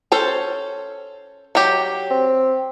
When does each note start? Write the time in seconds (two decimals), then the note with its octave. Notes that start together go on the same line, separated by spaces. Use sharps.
0.12 C#4 A4 C5
1.55 F#3 G4
2.10 C4